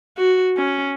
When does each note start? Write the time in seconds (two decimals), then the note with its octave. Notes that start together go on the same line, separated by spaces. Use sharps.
0.17 F#4
0.57 C#4